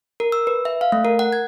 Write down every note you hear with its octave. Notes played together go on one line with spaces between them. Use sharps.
A#4
E6
B4
E5
F5
A3
A#4
F#5
G#6